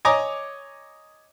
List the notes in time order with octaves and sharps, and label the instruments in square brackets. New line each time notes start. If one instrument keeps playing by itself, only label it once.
[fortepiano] C#5 D#5 G#5 A#5 D6 D#6